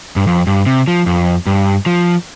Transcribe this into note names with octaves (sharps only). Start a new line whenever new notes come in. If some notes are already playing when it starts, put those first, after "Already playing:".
G2
F2
G2
C3
F3
F2
G2
F3